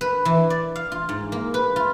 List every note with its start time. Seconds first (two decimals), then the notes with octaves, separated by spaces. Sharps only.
0.01 B4
0.25 E3
0.50 D5
0.76 F5
0.92 F4
1.09 G#2
1.32 A#3
1.54 B4
1.76 F4